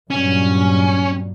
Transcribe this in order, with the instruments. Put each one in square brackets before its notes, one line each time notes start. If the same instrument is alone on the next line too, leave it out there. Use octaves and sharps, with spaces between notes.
[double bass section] G2 A#2 F#3 [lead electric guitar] C#4